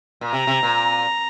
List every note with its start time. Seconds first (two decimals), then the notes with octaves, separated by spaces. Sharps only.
0.21 A#2
0.32 C3 A#5
0.47 C3
0.63 A#2